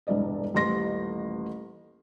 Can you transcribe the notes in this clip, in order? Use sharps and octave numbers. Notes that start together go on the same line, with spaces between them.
E1 C2 G2 D5 D#5
D#1 A1 G4 C6 A#6